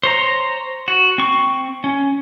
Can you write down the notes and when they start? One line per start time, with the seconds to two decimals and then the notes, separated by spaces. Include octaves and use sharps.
0.03 C5 C#5 A#5
0.88 F#4
1.18 C4 C#6
1.84 C#4